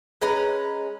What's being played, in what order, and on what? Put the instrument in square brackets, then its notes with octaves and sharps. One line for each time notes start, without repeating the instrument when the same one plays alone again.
[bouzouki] G#3 C#4 B4 A#5